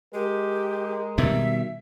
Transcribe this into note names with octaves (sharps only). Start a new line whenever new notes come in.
G#3 G4 A#4
B2 D#3 G3 E5